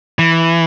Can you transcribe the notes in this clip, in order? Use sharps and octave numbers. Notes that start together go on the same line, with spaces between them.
E3